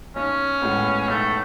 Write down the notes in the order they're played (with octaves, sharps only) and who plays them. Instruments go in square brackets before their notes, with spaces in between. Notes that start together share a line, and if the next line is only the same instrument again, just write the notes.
[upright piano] B1 [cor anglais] C#4
[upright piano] A2 G#3 B3
[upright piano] B1 [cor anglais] A3